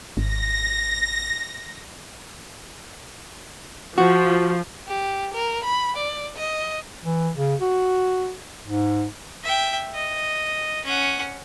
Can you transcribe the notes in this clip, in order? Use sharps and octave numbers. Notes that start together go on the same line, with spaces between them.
G#1 A#6
F3 F#4
G4
A#4
B5
D5
D#5
E3
C#3
F#4
G#2
E5 G5
D#5
C#4 F#5